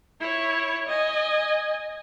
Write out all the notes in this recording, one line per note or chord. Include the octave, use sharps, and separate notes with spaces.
E4 C#5
D#5 G#5